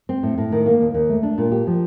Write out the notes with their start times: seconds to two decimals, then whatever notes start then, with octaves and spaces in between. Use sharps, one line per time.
0.09 C4
0.23 A2
0.38 A2
0.52 D#3
0.66 A#3
0.81 D#2
0.94 D#2
1.09 A3
1.23 D4
1.38 A#2
1.52 G4
1.67 F3